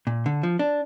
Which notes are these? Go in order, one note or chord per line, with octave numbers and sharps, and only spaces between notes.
A#2
D3
F3
D4